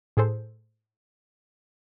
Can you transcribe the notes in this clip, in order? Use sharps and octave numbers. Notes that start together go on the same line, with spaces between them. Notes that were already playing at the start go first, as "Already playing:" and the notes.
A2 G#4 A4 C5